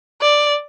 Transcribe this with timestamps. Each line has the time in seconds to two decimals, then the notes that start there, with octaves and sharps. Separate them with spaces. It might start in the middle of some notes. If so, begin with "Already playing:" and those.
0.22 D5